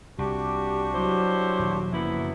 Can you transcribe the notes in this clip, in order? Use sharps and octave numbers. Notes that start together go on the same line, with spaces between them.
C2 D4 F#4 G4
F#3 E4 G4 C5
D#1
F#1 F#2 F3 A#3 B3 E4